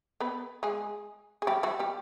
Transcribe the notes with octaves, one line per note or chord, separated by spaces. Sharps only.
B3 B4
G#3 G#4
G#4
G3 G4
F#3 F#4
G3 G4